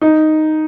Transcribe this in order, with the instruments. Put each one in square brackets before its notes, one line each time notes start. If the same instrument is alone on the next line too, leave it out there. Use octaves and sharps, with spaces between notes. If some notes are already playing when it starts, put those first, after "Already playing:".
[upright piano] D#4